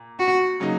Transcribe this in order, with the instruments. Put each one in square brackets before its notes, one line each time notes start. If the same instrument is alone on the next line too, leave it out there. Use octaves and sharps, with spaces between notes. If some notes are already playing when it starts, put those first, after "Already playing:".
Already playing: [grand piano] A#2
[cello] F#4
[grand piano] C#3 F#3 A#3 D#4